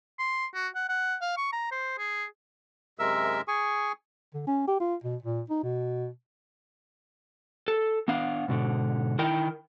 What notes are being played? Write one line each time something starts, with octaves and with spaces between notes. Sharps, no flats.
C6
F#4
F#5
F#5
F5
C#6
A#5
C5
G#4
F#2 C3 G#3 A#4 E5 E6
G#4 G#5 C#6
D3
C#4
G4
F4
B2
A#2
D#4
B2
A4
B3 D4 F5
G#2 B2 D3
D#3 E4 A#4 G5